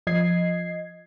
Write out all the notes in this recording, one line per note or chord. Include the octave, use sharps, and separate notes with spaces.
F3 D#5 G#6 C7